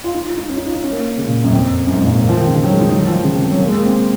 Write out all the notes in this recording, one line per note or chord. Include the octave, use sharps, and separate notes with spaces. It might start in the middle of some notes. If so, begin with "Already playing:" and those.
F4
D#4
F4
D#4
C#4
D#4
F4
D#4
C#4
A#3
C#3
A#2
F#2
F2
F#2
G#2
A#2
C#3
A#3
F3
D#3
C#3
D#3
F#3
G#3
D#4
F#3
D#3
F3
C#3
C3
C#3
F#3
A#3
G#3
A#3
C4